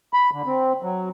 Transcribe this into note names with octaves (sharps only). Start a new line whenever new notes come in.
B5
D3
C4
F#3